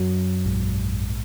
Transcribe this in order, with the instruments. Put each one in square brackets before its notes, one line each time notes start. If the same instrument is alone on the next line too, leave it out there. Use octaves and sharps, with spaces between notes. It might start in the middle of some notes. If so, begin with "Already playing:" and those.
Already playing: [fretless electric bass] F#2 F#3
A#1 G#2